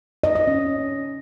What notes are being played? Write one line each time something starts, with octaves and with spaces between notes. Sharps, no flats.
D#5
D#5
C#4